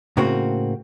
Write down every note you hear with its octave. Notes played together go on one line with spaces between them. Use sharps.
A2 C#3 A#3 C4 F#4